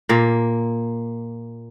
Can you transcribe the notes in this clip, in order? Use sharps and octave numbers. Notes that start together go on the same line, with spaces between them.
A#2 A#3